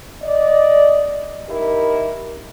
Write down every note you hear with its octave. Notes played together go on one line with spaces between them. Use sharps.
D5 D#5
D#4 E4 G4 A#4